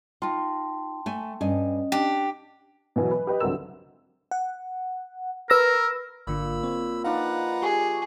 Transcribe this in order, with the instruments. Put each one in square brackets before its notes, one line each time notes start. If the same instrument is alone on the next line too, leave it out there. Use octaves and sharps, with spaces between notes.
[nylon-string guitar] D#4 F4 [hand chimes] G5 A5 C6
[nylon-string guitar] A3 G#5
[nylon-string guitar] G2 G#5 [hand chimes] C#4 D#5
[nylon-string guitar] D4 [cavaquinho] G4
[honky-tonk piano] B2 E3 F#3
B4
G4 B4 D#5
C2 D3 F#3 C4 A#4 E6
[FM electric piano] F#5
[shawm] A#4 [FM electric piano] B4 E6 A#6
[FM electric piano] G#1 D3 [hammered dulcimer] A#2 [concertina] B5 E6
[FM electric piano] C4 [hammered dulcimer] C#5
[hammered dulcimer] D#3 F3 D4 [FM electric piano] D#4 F5 [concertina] B4 F#5 A#5
[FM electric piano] G4 C#6 [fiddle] G#4